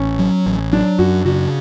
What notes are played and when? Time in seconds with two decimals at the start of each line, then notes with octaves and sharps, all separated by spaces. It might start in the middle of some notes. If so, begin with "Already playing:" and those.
Already playing: A1 C#4
0.19 F#3
0.46 A1
0.72 F#3 D4
0.98 F#2 F#4
1.25 C#3 F#4